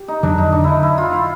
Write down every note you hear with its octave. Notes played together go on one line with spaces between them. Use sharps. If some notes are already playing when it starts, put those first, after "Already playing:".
Already playing: G4
D#4
F2 D3 F#3 D4
D#4
D4
D#4 E4
E4
F4
E4